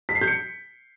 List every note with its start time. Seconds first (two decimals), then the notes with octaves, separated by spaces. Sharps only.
0.09 B6
0.15 C7
0.21 G6
0.28 C#7